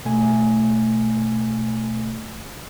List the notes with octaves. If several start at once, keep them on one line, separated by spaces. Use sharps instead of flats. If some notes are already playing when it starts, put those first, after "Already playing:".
B2 A3 G#5